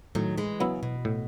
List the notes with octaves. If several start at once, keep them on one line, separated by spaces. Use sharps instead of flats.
A2 D#3 F#3
E3 G#3
C#3 F#3 B3 E4
B2
A2